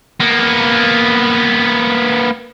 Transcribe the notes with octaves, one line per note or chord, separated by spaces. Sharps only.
A#3 B3